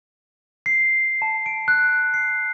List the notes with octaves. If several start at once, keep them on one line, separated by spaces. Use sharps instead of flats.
C7
A5
D7
F#6
C7